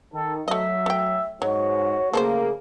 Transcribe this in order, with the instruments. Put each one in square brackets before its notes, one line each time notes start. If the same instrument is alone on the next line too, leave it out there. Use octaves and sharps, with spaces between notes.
[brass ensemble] D#3 [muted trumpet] A4
[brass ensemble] F#3 [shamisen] A3 D#5 [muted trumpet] E5
[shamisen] A3 G5
[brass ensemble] G#2 [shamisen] F#3 [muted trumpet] F#4 [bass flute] C#5
[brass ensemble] C#3 A3 A#3 [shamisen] F3 A4 C5 [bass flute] G#4